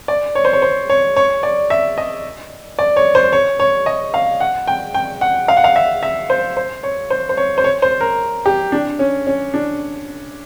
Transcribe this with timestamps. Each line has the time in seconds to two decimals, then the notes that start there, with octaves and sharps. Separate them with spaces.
0.08 D5
0.35 C#5
0.45 C5
0.53 C#5
0.62 C5
0.90 C#5
1.16 C#5
1.43 D5
1.70 E5
1.98 D#5
2.79 D5
2.96 C#5
3.15 C5
3.33 C#5
3.60 C#5
3.86 D#5
4.14 F5
4.40 F#5
4.68 G5
4.94 G5
5.21 F#5
5.48 F5
5.57 F#5
5.64 F5
5.76 E5
6.03 E5
6.30 C5
6.57 C5
6.83 C#5
7.10 C5
7.29 C5
7.37 C#5
7.58 C5
7.64 C#5
7.82 C5
8.01 A#4
8.46 G4
8.72 D4
8.99 C#4
9.27 C#4
9.54 D4